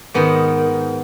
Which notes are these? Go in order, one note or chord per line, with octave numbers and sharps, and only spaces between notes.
G#2 D#3 B3